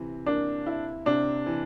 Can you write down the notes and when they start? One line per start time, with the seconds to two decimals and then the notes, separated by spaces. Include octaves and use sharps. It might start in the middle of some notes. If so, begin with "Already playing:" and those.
Already playing: C3 E3
0.26 A#3 D4
0.66 E4
1.06 C3 D4
1.46 E3